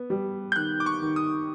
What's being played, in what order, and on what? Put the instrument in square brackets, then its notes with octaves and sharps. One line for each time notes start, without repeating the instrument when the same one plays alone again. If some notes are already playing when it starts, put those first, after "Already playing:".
Already playing: [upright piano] B3
G3
[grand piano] G6
[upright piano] D#3 [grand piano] F#6
[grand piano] D6
C#6
[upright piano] D#3
[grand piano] D#6